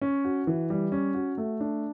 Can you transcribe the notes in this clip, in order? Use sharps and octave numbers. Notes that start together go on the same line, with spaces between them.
C#4
F#4
E3
G3
C#4
F#4
A3
D4